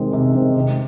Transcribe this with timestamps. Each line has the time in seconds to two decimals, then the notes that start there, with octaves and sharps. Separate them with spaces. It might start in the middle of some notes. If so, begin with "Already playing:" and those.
Already playing: C3 D#3 G#3 C4
0.13 C3
0.34 D#3 G#3 C4
0.55 C3